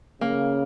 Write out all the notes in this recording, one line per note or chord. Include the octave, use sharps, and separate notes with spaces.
C#3 A#3